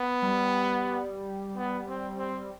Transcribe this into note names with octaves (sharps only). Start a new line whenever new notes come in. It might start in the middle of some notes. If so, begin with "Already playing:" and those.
Already playing: B3
G3
B3
C4
C4